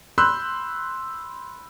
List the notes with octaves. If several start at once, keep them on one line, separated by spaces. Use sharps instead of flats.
B5 C6 E6 F#6 G6